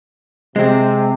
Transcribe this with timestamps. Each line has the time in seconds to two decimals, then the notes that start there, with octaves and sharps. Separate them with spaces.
0.56 C3 G#3 C4